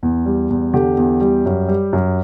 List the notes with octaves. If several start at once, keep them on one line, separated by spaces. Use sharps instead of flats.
E2
G3
E2
D3 G4
E2
G3
F#2
G3
F#2